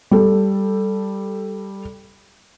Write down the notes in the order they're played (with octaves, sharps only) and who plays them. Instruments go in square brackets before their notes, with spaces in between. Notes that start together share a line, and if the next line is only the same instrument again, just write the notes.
[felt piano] G3 A4